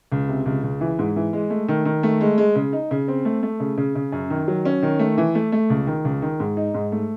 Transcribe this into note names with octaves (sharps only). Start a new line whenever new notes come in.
C#2
C3
C#2
C#2
E3
G#2
E3
G#3
A3
D#3
D#3
A3
G#3
G#3
C#3
D#4
C#3
C4
A3
A3
C#3
C#3
C#3
F#2
D#3
F#3
C#4
D#3
A3
E3
A3
A3
C#2
D#3
C#2
D#3
G#2
D#4
G#2
A3